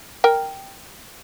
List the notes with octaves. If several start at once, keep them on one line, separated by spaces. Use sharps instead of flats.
A#4 G5